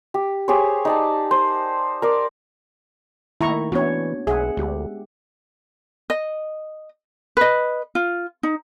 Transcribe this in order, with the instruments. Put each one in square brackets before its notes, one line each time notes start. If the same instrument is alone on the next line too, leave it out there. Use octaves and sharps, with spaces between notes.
[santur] G4
G4 G#4 C5 C#5
D#4 D5 A5
C5
A#4 D5
[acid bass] D#3 [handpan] A3 A#3 [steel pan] E4 A#5 C#6
[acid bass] E3 [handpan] B3 C#4 D4 [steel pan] F#4 C#5
[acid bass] B1 [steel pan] G#4 [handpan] E5 F#5
[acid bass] D2 [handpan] G#3 G4
[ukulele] D#5
B4 D#5
F4
D#4